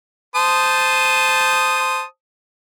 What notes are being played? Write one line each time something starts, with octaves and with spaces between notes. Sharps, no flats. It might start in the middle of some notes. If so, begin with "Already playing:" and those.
C5 A5 D#6